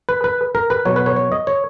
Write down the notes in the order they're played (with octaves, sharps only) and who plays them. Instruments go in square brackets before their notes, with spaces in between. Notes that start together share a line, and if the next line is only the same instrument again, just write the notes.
[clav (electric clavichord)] B4
B4
A#4
B4
B2 F#3 C#5
B4
C#5
C#5
D#5
C#5